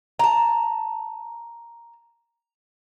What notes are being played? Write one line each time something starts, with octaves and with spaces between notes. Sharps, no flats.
A5 A#5